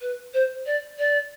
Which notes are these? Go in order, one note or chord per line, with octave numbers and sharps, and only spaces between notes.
B4
C5
D5
D5